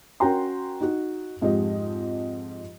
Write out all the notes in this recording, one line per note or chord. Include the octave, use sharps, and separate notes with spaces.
C#4 F#4 A#4 G5 A#5 C6
D#4 F#4
F2 G#2 G4 D#5